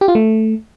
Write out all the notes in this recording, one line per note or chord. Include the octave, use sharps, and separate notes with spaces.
G4
F4
A3